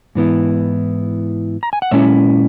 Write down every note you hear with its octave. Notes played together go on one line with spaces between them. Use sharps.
G#2 E3 B3 E4
A#5
G#5
F#5
A#2 G#3 C#4 E4 C#5 E5